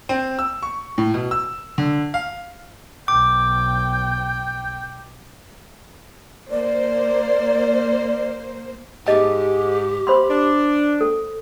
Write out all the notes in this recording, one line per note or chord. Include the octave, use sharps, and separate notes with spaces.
C4
E6
C#6
A2
B2
E6
D3
F5
B1 G5 D6
A#3 C5 D5
G#2 G4 D#5 A5
C5 B5 C6
D4
A4